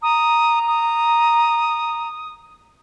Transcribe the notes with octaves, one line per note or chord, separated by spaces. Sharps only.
A#5 D#6
D#6